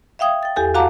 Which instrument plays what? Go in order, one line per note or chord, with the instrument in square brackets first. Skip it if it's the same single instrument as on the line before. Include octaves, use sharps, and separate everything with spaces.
[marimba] E5 F5 G5 D#6 G#6
G5 A6
E2 G4 A4 G#5
F#4 F5 F#5 A5 A#5 D6